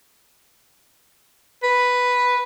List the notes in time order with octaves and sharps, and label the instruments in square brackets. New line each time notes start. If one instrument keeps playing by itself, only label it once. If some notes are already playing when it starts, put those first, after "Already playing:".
[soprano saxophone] B4